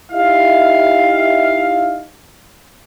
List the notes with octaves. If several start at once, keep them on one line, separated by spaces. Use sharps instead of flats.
D#4 E4 G4 E5 F5